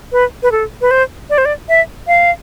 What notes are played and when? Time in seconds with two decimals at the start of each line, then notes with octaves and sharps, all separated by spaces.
0.12 B4
0.43 B4
0.52 A4
0.81 B4
0.91 C5
1.30 D5
1.38 C5
1.45 D5
1.69 E5
2.07 F5